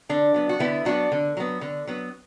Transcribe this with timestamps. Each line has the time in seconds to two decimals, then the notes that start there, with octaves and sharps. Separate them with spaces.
0.09 D3 D4
0.34 F#3 B3
0.49 F#4
0.59 D3 B3 E4
0.85 F#3 B3 D4 F#4
1.12 D3
1.37 F#3 B3
1.61 D3
1.87 F#3 B3